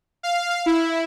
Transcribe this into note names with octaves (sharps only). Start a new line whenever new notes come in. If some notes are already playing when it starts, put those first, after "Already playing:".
F5
E4